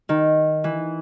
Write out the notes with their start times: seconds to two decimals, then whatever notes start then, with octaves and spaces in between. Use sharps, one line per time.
0.09 D#3
0.64 E3